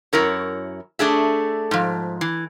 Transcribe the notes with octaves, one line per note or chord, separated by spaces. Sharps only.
F#2 E4 A#4 C#5
A3 D4 G#4 E5
G#2 F3
E3